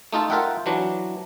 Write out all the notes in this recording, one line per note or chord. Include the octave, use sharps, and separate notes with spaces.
A3 D#4 F4 A4
F4 A#4 E5 F#5 G5
E3 F#3 D4